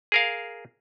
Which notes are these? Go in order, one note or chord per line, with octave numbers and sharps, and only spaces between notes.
G#4 A#4 F5